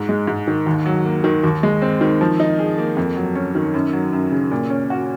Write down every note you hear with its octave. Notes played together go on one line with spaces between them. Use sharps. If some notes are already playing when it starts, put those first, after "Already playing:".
Already playing: G#2
G#3
G#2
D#3
D#2
F#3
A#3
D#3
D#2
G#3
C4
D#3
F3
D#4
G#4
A#3
F2
F#3
C#4
D#3
F#2
F#3
F#2
C#3
A#2
C#4
F#4